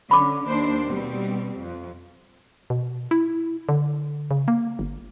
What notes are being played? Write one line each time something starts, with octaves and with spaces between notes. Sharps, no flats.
D3 C#4 B5 D6
D#2 D4 C5
B2 G3 C4
F2
B2
E4
D3
C#3
A#3
G1